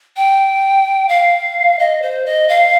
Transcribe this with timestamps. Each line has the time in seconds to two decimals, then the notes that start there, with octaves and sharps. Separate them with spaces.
0.17 G5
1.09 F5
1.79 D#5
2.02 C5
2.25 D#5
2.49 F5